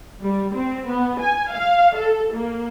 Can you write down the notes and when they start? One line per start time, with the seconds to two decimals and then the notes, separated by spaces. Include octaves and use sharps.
0.22 G3
0.55 C4
0.86 B3
1.20 G#5
1.53 F5
1.96 A4
2.34 A#3